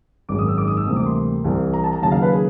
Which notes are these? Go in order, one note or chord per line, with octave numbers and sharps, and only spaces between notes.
G#1 F#2 D#3 G#3 D6
D#6
E6
D6
D#6
E6
D2 C3 E3 G3 A#3 D#6
D6
C6
C2 C3 E3
A#5
A5
A#5
D#2 C#3 F#3 A5
F5
B4
G#4